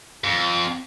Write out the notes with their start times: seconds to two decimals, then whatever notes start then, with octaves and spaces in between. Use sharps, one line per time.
0.24 F2